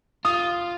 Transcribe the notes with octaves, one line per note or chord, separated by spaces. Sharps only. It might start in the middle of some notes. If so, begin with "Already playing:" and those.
F4 D#6